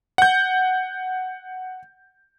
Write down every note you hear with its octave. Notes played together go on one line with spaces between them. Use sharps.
F#5 G6